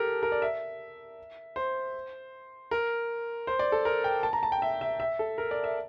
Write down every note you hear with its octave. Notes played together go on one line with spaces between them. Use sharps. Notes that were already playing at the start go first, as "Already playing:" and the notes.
Already playing: G4 A4 A#4
A#4
D5
E5
C5
A#4
C5
D5
A4
A#4
G5
A5
A#5
A5
G5
E5
E5
E5
A4
A#4
D5
E5